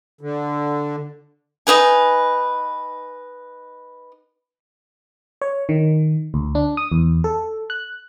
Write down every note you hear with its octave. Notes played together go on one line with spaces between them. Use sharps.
D3
D#4 E4 B4 G#5
C#5
D#3
D2
D4
D#6
E2
A4
F#6